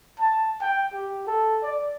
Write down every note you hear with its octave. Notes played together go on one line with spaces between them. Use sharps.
A5
G5
G4
A4
D5